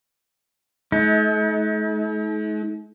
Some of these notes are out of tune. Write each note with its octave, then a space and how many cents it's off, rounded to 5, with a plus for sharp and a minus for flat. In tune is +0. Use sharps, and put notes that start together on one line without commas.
A3 -45 D#4 +40